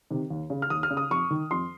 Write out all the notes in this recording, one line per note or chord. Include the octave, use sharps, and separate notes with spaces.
C3 D#3
D#2
C#3
F6
D#2 D#6
F6
C#3
D#6
F2 C#6
D#3
F2 C6